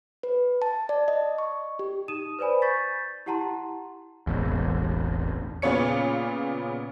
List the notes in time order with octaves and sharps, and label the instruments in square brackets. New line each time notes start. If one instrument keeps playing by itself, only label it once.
[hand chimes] B4
A5
D5
D#5
C#6
G4
[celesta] D#4 D#6 D#7 E7
B4 C5 D5 G#5 B5
C#6 G6 A6 B6
E4 G4 F#5 A5 A#5 C6
[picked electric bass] E1 A1 E2
[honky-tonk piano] A#2 C#3 B3 C#5 C#7